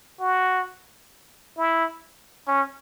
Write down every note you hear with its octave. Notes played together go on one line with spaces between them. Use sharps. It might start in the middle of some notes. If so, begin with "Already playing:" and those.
F#4
E4
C#4